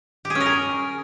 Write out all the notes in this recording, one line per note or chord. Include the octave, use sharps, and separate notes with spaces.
G4
G#4
C#4
A#4
G#4